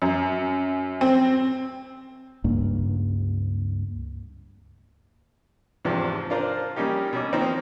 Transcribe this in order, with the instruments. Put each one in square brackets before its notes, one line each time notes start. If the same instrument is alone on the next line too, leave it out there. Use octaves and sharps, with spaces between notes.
[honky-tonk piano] F#2
C4
[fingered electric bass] C#2 G2 A#3
[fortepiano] E2 G#2 C3 F3 D4
D4 F4 A#4 C5
G3 A#3 C#4 D#4 G4
B2 C#4 D6
D#3 F3 A#3 C4 D#4